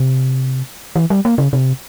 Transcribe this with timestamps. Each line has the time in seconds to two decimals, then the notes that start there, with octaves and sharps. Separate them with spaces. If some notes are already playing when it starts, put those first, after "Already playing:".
Already playing: C3
0.96 E3
1.10 G3
1.25 A#3
1.38 C#3
1.53 C3